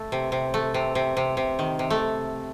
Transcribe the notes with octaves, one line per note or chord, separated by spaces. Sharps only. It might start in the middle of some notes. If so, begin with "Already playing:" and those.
Already playing: A3
C3
C3
A3
C3
C3
C3
C3
D#3
C3
A3